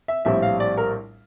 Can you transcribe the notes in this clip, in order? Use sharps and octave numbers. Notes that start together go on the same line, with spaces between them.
E5
A#1 A2 G3 C4 E4 E5
F5
D5
A#4